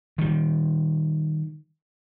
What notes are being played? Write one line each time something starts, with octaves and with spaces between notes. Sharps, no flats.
D#3 G3